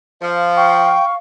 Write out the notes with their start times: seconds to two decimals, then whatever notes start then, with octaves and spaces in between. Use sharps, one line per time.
0.22 F3 F5
0.57 G5 C#6